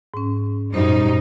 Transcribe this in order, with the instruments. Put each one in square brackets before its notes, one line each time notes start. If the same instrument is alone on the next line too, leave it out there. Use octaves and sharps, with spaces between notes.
[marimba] G#2 C#4
[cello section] F#2 G3 D#4 [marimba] A#2 C5